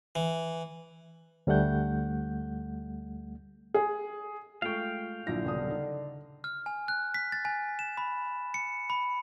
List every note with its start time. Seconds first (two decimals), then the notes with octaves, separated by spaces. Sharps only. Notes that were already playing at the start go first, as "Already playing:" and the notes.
0.15 E3
1.47 D2 G3 A3 F#5 G6
3.74 G#4
4.62 G#3 A3 F4 F5 G5 C#6
5.27 A#1 D3 F#3 E4 A#6
5.45 D#1 B1 C#3 D#6
5.70 D#4
6.44 F6
6.66 G#5
6.88 F#6
7.14 B6
7.32 A6
7.45 G#5
7.79 E7
7.97 B5
8.54 C#7
8.90 B5